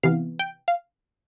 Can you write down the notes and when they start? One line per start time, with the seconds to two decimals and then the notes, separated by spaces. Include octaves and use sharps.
0.03 C3 E3 B3 F5
0.39 G5
0.68 F5